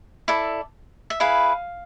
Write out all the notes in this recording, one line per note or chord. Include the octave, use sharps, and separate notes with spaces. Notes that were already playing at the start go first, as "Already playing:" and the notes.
E4 A4 D5
E5
E4 G#4 B4 F5